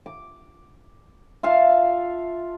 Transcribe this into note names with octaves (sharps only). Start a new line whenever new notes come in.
D6
F4 E5 F5 A5